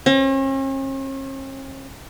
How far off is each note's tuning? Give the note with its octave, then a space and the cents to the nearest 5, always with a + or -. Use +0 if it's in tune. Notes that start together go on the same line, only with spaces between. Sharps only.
C#4 -45